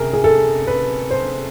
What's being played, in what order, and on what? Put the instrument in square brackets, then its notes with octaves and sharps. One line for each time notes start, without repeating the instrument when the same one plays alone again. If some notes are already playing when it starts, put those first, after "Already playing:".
Already playing: [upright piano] C3 G#4 A#4
G#4
A4
B4
C5